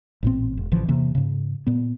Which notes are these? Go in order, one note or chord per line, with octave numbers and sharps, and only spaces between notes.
A1 A#2 C4
E1
A1 D3 E3 F3
E2 C3 E3 A#3
G#2 C#3
A#2 B3